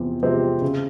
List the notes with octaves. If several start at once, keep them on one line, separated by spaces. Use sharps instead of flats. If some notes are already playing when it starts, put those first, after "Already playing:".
Already playing: E2 C3 F3 C4
C3 F3 G#3 C4
C#3